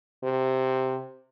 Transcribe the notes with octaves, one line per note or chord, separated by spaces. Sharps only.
C3